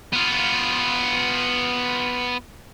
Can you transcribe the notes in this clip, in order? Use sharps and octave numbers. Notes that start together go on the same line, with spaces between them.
B3 F4